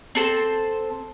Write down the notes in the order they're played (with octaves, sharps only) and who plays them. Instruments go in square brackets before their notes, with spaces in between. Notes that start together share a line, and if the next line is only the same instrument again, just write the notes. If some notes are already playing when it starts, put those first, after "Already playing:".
[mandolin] C4 A4 C5